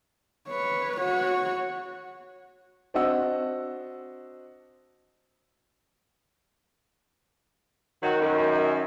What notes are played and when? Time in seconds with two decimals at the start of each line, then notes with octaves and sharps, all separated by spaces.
0.49 B4 C#5
0.97 F#4 C#5
2.94 C4 D4 F#4 D#5 F#5 E6
8.03 D#3 F#3 D#4 F#4
8.20 F#2